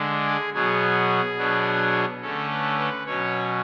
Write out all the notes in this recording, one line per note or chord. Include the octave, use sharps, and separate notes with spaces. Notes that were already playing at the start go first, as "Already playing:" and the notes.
Already playing: D3 G#3 D4
G#4
B2 F#3 B3 G#4
B2 F#3 B3 D4
D3 A3 C#4 A4
B4
B4
B2 F#3 C#4 C#5